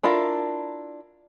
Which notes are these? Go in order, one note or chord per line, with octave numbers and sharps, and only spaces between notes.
D4 E4 F4 A4 A#4